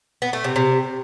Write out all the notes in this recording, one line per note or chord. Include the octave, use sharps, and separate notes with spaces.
B3
A3
C3
C3